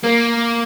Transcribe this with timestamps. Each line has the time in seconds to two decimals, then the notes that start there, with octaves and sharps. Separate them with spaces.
0.03 A#3